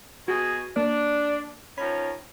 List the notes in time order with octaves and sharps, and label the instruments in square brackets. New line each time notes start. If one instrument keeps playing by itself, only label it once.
[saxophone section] B2 G#4 [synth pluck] F#4
[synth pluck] A#3 [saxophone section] D4
[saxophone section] D#3 F3 C#4 [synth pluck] B5